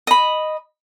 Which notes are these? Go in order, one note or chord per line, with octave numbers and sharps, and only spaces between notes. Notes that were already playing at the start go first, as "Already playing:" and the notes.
D#5 B5